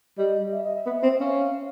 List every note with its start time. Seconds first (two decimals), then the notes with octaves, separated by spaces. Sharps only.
0.18 G3 D#5
0.52 E5
0.64 D#5
0.75 E5
0.86 B3
1.03 C4
1.08 E5
1.20 C#4 F5